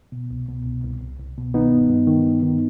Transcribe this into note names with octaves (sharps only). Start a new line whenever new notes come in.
B2
C2
B2
C2
C2
C2
C2
B2
D#3 B3 D#4
G2
G2
D#3
G2
D#3